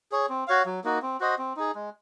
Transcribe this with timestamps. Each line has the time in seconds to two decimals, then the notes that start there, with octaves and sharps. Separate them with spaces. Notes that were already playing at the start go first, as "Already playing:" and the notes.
0.12 G#4 C#5
0.29 C4
0.47 F#4 C#5 F5
0.66 F#3
0.84 A#3 D#4 F#4
1.02 C4
1.20 F#4 C5 D#5
1.38 C4
1.57 D#4 G#4
1.75 G#3